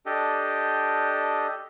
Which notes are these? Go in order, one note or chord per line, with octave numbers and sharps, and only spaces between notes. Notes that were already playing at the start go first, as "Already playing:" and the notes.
D4 G4 A4 D#5